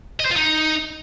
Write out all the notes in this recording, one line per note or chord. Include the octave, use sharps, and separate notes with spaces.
D#5
C5
F4
D#4